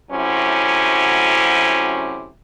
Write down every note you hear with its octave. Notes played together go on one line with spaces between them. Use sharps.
D2 C3 F#3 C#4 E4 C5